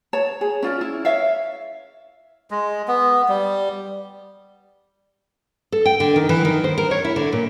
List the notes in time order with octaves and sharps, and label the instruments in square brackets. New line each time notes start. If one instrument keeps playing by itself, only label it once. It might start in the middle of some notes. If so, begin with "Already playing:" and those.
[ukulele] C#5 A5
G#4
C#4 F4 D5
E4
C#5 E5 F5
[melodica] G#3
B3
G3
[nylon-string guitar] A4
G5
D3
D#3
E3
D#3
C5
A#4
C#5
E4
D3
A#2